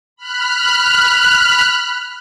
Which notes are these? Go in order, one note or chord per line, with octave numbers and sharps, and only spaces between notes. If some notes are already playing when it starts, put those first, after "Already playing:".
B5 F6 F#6